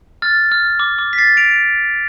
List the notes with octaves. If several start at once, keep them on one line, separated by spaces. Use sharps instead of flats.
F6 A6
F6
D6
D6
B6
A6 C7
D7 F7